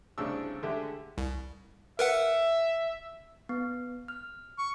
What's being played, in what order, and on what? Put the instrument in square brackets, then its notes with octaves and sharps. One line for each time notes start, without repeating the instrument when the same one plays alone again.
[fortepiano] C2 A2 C#3 D4 E6
D3 G#3 A3 G4 E5
[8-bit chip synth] C2
[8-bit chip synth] A#4 B4 F#5 [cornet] E5
[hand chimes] B3
F6
[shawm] C#6